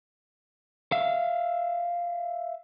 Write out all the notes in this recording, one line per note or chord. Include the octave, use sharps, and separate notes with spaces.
E5 F5